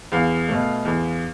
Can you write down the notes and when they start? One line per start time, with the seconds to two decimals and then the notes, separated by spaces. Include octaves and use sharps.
0.12 E2 F5
0.49 B2 A3
0.85 E2